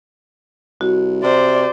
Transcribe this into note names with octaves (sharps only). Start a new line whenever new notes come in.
C2 F#4
C3 C5 D5